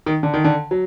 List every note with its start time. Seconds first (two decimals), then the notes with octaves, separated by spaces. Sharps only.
0.06 D#3
0.23 D3
0.34 D#3
0.44 D3
0.71 F#3